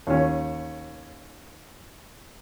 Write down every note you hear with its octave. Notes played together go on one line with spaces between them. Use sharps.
D#2 C#4